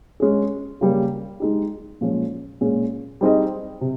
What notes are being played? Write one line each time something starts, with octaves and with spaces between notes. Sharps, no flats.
G#3 C#4 G#4
C#3 G3 A#3
G#3 D#4 G4
A#2 F3 G#3 C#4
A#2 G#3 C#4 G#4
G3 C4 D#4 G#4 D#5
C3